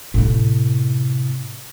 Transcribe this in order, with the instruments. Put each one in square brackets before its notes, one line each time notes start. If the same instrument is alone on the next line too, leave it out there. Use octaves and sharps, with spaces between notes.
[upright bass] A2 C3